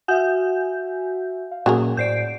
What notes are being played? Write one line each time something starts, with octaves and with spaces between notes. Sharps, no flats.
F#4 E5 F#5 G#5 G6
F5
A#2 F#3 A#3 C#4 G#4 A#4
A2 C5 D5 G6 C7 D7